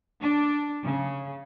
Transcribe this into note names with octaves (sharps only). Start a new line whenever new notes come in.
D4
C#3